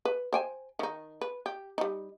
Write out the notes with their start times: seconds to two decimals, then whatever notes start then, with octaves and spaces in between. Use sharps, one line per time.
0.05 B4
0.33 C5 G5 G#5
0.79 D#3 D#4
1.21 B4
1.46 G4
1.78 G3 D#4